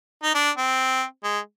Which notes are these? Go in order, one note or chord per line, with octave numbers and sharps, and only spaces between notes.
D#4
D4
C4
G#3